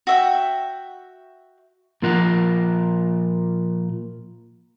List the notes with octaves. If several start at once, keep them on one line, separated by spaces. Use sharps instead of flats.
F#4 E5 G5
A#2 F3 F4 A#4 F#5